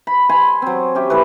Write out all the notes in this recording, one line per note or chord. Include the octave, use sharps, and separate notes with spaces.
B5
G#5 B5 C6
F#3 C4
C#4 G4 E5
A2 E3 E4 B4